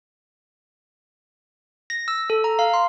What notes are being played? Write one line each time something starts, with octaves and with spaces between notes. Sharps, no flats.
A#6
E6
A4
A#5
F5
C6